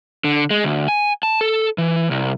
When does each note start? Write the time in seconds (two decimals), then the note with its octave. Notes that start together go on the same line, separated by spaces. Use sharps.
0.24 D3
0.51 G#3
0.64 D2
0.88 G#5
1.23 A5
1.41 A4
1.78 E3
2.11 C2